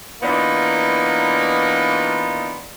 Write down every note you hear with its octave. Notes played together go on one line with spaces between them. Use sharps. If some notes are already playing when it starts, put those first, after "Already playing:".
E3 A#3 B3 D4 D#4 F4